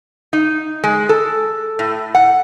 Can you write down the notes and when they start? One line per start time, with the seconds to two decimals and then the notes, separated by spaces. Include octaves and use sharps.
0.33 D#4
0.84 G#3
1.09 A4
1.79 A2
2.15 F#5